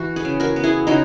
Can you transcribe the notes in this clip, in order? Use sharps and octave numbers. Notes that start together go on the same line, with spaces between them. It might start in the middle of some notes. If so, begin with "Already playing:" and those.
Already playing: E3 E4 F#4
G#4 B4
C#3
F#4 A#4
B3
E4 G#4
C#3 D#4 F#4